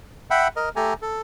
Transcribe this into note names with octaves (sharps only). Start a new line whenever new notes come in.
E5 F#5 G5 B5
A#4 D#5
A3 G4 A4 G#5 A#5
A4